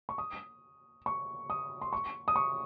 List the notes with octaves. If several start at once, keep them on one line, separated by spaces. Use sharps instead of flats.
C#6
D#6
C#6
D#6
C6
C#6
D#6
C#6